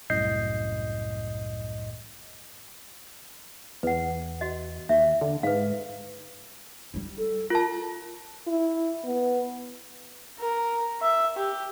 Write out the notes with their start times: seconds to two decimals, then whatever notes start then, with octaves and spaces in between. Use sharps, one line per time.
0.10 C2 F#2 A2 D#5 G6 C7
3.83 E2 B4 F#5
4.41 F#4 D#5
4.89 D#2 E5
5.21 D3
5.43 G#2 B4 F5
6.94 G3 E4
7.18 A4
7.50 F4 A#4 A5
8.47 E4
9.04 B3
10.39 A#4
11.02 E5
11.37 G4